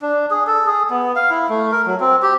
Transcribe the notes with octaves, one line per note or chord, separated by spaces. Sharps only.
D4
G#4
A4
G#4
B3
F5
E4
A3
A#4
F#3
C4
G4